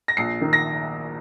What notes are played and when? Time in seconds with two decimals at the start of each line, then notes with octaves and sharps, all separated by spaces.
0.08 A#6
0.17 A#1 C7
0.41 D#3
0.53 A#6